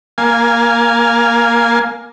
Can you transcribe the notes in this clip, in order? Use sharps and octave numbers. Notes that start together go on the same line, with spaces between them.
A#3 F5 G#5